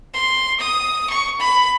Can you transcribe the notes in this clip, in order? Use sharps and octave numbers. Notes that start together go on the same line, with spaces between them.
C6
D#6
C#6
B5